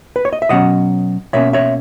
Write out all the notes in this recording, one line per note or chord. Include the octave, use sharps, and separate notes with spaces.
B4
C#5
D#5
E5
B2 F#3 C#4 D#5 F#5
B2 A#3 C#4 C#5 E5
C#5 E5